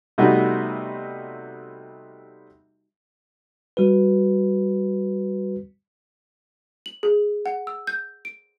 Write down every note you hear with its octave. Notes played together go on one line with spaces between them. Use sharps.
C3 G3 A3 B3 D#4 F#4
G3 F#4 B4
F#7
G#4
F#5
E6
G6
D7